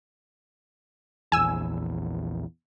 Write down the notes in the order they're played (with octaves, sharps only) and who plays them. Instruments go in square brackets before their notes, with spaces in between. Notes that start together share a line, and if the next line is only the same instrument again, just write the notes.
[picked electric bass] A#1 E2 [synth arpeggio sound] G#5 E6